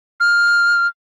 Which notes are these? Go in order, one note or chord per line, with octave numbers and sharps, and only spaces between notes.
F6